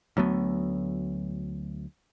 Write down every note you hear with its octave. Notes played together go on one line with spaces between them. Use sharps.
D2 F#3 A3 B3